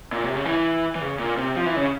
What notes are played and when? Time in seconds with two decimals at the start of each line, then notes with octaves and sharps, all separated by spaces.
0.13 A#2
0.23 C3
0.35 C#3
0.46 E3
0.95 E3
1.01 C#3
1.19 A#2
1.38 C3
1.56 F3
1.66 E3
1.76 C#3